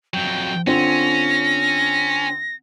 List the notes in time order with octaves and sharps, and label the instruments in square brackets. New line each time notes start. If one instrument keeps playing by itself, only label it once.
[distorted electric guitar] F2 F#3 [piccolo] G5
[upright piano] D3 C4 F4 [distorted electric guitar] C#4 [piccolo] A#6